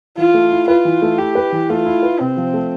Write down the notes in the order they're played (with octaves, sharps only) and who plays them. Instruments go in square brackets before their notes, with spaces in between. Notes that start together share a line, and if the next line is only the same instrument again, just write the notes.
[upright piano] E3 [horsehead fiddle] F4
[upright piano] A3
E4
[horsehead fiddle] F4 [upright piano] B4
[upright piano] E3
A3
[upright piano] E4 [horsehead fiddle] G4
[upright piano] B4
E3
[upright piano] A3 [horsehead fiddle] F4
[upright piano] E4
B4
[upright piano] C3 [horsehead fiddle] C4
[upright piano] F3
A3